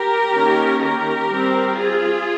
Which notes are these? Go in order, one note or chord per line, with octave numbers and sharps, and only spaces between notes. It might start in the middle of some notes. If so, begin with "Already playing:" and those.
Already playing: G4 A#4
D#3 A#3 C#4
G4 A#4
G3 C4
F4 G#4